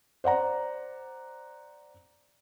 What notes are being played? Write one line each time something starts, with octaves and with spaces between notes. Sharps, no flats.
C5 D5 F#5 A#5